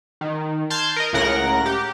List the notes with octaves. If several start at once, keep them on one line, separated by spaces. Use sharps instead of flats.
D#3
A5 C6 F6 G6 G#6
A#4 D#5
C#2 A2 C#3 A#4 F#5 A#6
G4